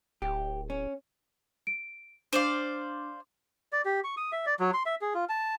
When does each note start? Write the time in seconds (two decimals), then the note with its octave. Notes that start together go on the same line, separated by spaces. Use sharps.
0.22 D1 G4
0.70 C#4
1.67 D7
2.33 D4 C5 D5 F5 D6
3.73 D5
3.85 G4
4.04 C#6
4.17 D#6
4.32 E5
4.46 D5
4.60 F#3
4.74 C6
4.86 E5
5.01 G#4
5.14 F4
5.29 A5